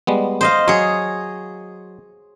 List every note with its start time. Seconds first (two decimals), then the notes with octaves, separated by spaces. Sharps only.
0.07 G3 G#3 B3
0.41 C5 D#5 F5
0.68 F#3 G#4 C#5